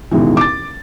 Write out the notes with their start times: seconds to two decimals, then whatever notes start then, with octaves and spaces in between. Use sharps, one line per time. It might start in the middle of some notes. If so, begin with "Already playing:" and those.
0.11 A1 D#2 G#2 B2 E3
0.37 D6 A6